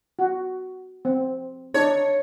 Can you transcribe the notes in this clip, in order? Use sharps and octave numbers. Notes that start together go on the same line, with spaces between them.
F#4
C4
D4 D#4 C#5